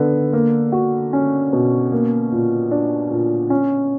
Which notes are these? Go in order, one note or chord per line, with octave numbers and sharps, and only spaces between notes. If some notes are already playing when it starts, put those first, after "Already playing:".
Already playing: D3 B3
A#3
F#4
C#4
B2
A#3
A#2
D4
A#2
C#4